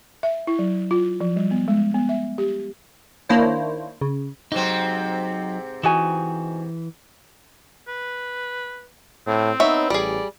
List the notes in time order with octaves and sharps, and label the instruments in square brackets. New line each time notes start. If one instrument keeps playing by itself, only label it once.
[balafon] E5
E4
F#3
F4
F3
G3
B3
G#3
B3
E5
G4
[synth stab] D#3 A#3 D4 E4 C5 C#5
C#3
[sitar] G#2 C3 C4 [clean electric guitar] F#3 D#4
[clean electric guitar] E3 [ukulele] D#4 F#4 G#5
[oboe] B4
[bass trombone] A2 [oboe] C4
[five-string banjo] B3 C#5 E5 [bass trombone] D#4
[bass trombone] A1 [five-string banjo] G3 G#4 [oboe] D5